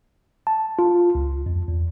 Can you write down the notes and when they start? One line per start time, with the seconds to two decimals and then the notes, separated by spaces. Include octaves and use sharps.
0.47 A5
0.79 F4
1.15 C#2
1.46 F2
1.68 E2